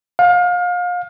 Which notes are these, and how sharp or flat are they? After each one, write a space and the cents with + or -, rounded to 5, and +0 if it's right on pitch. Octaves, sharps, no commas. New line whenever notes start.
F5 +30